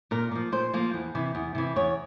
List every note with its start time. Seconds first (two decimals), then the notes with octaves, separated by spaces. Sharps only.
0.11 A#2 A#4
0.32 F3 A#3
0.52 A#2 C5
0.73 F3 A#3
0.94 E2
1.15 C3 E3
1.35 E2
1.55 C3 E3
1.76 E2 C#5